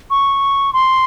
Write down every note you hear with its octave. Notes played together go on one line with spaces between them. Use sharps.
C#6
C6